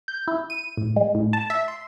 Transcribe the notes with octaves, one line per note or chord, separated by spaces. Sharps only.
G6
E4
D#7
A2
G#3
A2
A5
E5
C6